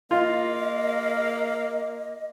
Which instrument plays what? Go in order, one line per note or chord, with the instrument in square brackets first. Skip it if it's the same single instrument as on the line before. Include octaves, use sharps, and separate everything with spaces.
[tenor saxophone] A#3 [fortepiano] F4 [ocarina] D#5